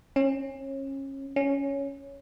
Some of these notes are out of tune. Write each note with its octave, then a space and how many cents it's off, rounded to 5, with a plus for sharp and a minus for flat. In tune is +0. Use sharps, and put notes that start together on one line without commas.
C#4 -30
C#4 +5